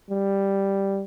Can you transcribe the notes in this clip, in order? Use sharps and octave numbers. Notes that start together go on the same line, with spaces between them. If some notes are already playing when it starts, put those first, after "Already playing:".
G3